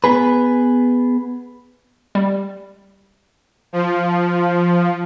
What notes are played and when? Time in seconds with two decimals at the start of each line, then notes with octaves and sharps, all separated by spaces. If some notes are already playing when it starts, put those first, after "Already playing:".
0.04 B3 G#4 B4
2.15 G3
3.73 F3